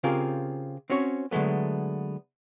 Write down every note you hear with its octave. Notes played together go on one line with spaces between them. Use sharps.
C#3 C4 F4 G4 G#4 A#4
C4 C#4 F#4 C#5
D3 F#3 G#3 A3 B3